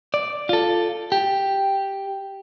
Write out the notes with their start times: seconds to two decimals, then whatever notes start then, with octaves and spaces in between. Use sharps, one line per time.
0.14 D5
0.49 F4 A4
1.12 G4